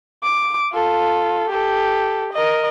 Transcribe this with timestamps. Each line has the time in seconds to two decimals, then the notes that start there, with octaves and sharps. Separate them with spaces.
0.23 D6
0.73 F4 A4
1.50 G4 A4
2.33 A#4 D#5